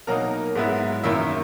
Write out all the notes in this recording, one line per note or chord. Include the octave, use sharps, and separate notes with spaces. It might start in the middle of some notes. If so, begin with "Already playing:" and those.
B2 F#3 A#3 D#4 A#4 A#5
G#2 F#3 B3 E4
F#2 D#3 A#3 E4 E5